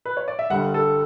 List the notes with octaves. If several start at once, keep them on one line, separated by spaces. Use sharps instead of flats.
B4
C#5
D5
E5
G1 G2 D3 G3 F#5
A4